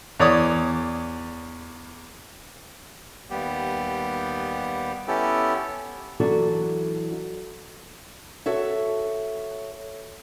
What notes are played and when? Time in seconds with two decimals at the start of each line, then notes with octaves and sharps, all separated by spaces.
0.20 E2 C#5 D5 D#6
3.30 D#2 G3 B3 G4
5.08 B3 C#4 E4 G4 A4
6.20 E3 F#3 D4 F#4 A4
8.46 F#4 A4 C#5 E5